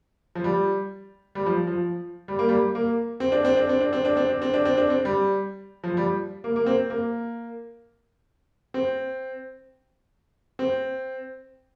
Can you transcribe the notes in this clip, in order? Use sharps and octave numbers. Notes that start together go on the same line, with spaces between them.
F3
G3
G3
F3
F3
G3
A#3
G3
A#3
C4
D4
C4
D4
C4
D4
C4
D4
C4
D4
C4
D4
C4
D4
C4
G3
F3
G3
A#3
A#3
C4
A#3
C4
C4